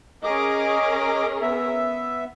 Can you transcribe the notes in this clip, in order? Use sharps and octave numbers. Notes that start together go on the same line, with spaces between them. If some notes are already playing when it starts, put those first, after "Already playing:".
C#4 G#4 A#4 D#5 D6
B3 E5